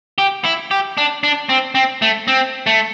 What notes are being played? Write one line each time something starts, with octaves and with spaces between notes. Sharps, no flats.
G4
E4
G4
D4
D4
C4
C4
A3
C4
A3